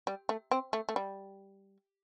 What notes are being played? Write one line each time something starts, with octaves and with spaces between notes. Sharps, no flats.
G3
A3
C4
A3
A3
G3